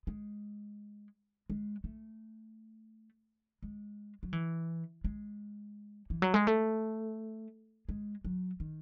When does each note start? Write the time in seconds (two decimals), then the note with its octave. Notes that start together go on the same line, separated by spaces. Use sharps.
0.07 G#3
1.50 G#3
1.84 A3
3.63 G#3
4.23 F#3
4.33 E3
5.04 G#3
6.10 E3
6.22 F#3
6.34 G#3
6.47 A3
7.89 G#3
8.25 F#3
8.60 D#3